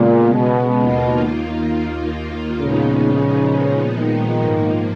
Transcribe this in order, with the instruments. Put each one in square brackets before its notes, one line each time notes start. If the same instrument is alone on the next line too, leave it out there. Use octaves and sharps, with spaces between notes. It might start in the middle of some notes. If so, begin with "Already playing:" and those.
Already playing: [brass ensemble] A#2 [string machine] C#3 G#3 B3
[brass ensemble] B2
[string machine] D#2 D#3 A#3 F4
[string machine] A#2 F3 G#3 B3 D#4 [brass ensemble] C#3
[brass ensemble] D#3
[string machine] G#2 F3 A#3